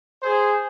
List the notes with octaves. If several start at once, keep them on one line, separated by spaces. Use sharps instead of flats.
G#4 C5